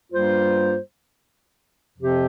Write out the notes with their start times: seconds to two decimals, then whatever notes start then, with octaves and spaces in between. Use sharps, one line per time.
0.12 G2 G3 A#3 F4 C5
1.99 F2 C3 F3 C4 G4